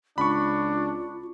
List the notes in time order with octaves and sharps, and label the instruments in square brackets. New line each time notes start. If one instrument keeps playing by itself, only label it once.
[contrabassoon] C#2 [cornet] D4 [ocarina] F4 [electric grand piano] B5 C#6